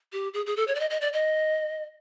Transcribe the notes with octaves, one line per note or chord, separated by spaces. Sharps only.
G4
G#4
G#4
A4
C#5
D5
D#5
D#5
D5
D#5